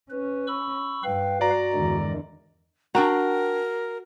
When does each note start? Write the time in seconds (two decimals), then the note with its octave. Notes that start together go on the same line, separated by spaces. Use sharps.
0.11 C#4 B4
0.48 B5 C#6 E6
1.04 G2 B4 F5 G5
1.41 F#4 D5 A#5
1.74 E2 G2 D3 D#3 G#3
2.95 D4 F#4 A#4 G5 A#5